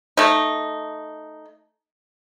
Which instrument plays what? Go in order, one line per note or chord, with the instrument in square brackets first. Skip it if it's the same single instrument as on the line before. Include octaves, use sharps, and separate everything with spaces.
[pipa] A3 D#4